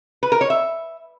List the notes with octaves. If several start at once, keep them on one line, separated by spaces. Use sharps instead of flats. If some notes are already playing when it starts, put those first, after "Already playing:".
B4
A#4
C#5
E5